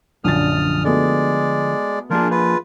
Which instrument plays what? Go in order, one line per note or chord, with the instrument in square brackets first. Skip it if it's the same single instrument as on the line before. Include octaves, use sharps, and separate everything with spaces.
[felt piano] A#1 F#2 A6 [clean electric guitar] D3 F3 [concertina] D#6 F6
[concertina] G#3 D5 [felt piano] A3 B3 F#4
[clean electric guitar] F3 A#3 G#4 [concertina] D4 F4 A#4
[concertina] F4 B4